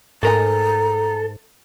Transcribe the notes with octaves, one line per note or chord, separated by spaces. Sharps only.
G#2 A3 A4 A#4 G#5 A#5